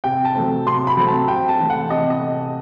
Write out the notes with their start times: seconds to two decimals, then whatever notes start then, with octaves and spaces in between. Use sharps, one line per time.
0.04 C3 G5
0.25 A5
0.35 F#3 A3 C4
0.66 C3 C6
0.87 B5
0.97 F#3 A3 C4
1.08 A5
1.28 C3 G5
1.48 A5
1.59 E3 A3
1.70 F#5
1.90 C3 D#5
2.10 D#5